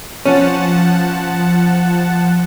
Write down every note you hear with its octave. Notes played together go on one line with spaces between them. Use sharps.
F3 C#4 F#5 A5